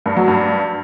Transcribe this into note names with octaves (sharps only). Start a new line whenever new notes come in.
G2
F#3
G2